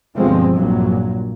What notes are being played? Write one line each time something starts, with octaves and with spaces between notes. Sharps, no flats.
G1 B2 F3 G#3 C4
A#1 G2 A#2 F#3